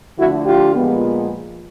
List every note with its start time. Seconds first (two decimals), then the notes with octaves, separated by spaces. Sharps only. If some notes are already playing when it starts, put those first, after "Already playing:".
0.18 D3 F3 A3 E4 F#4
0.46 F4 G4
0.75 A#2 F3 G#3 B3